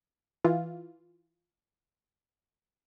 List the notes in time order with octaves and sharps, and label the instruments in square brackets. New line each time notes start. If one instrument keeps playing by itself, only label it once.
[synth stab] E3 F4